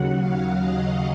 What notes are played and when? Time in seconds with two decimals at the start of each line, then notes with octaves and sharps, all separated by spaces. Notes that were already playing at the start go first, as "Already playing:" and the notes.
Already playing: D#2 C#3 F#3 F#5
0.18 F5
0.60 D#5